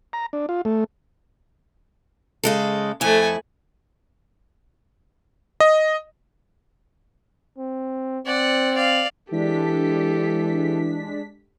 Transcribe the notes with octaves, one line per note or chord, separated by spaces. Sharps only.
A#5
D4
F4
A3
C#3 G#3 A4
F2 A3 E4 G#5
D#5
C4
C4 D5 F#5
D5 F5
E3 G#3 D4 G4 A4 B6